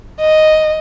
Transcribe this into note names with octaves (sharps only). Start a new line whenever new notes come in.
D#5